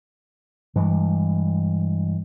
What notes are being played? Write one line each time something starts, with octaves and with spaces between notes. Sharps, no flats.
G2 E3 G#3